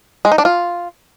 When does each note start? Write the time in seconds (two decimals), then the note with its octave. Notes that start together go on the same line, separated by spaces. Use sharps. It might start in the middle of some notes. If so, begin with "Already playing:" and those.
0.25 G#3
0.32 D#4
0.38 D4
0.45 F4